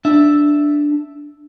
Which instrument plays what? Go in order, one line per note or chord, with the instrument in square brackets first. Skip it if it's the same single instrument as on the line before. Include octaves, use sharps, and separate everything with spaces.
[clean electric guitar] D4 E5